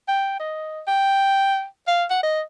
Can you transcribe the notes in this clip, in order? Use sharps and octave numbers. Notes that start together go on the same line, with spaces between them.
G5
D#5
G5
F5
F#5
D#5